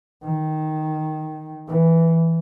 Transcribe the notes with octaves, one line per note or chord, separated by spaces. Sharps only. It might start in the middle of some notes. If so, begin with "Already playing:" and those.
D#3
E3